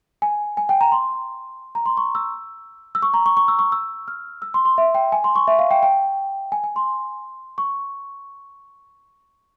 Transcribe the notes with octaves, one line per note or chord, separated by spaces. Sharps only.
G#5
G#5
G5
A#5
C6
A#5
C6
C#6
E6
E6
C#6
A#5
C#6
C#6
E6
C#6
E6
F6
E6
C6
C6
E5
G5
G#5
C6
C#6
E5
F5
G5
G5
G#5
G#5
C6
C#6